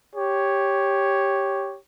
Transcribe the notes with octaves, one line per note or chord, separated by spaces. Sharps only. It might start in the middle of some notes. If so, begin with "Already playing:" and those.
G4 C#5